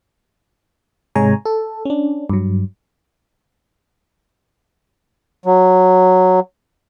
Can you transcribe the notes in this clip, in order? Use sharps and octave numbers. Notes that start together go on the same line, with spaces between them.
G#2 C3 G#3 C#5 G#5 A#5
A4
C#4 D4
G2 F#3
F#3